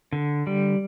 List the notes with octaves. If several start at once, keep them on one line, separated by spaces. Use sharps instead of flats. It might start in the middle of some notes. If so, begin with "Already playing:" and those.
D3
G3